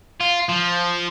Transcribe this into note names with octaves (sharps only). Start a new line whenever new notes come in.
F4
F3